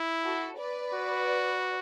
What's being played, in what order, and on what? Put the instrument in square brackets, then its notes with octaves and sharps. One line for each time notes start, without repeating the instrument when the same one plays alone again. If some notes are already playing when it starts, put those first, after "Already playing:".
Already playing: [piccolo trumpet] E4
[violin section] F#4 A4
B4 D5
[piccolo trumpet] F#4